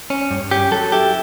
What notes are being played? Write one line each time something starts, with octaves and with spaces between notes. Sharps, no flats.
C#4
G2
C#4 G4
F#3 A4
E4 G4